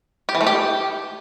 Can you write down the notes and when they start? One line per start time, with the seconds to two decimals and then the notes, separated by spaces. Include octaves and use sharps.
0.29 G4
0.35 E3
0.41 A3
0.47 G4